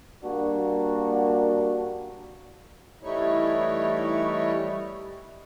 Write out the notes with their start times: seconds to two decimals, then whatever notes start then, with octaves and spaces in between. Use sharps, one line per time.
0.23 G3 A#3 D4 F#4
3.03 E3 G3 A3 D#4 E4 C#5